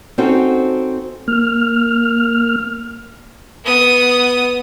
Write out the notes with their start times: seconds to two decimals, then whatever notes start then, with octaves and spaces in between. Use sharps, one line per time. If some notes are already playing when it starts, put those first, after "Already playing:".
0.18 C4 C#4 D#4 F#4 A4 C5
1.28 A#3 F6
3.64 B3 D#6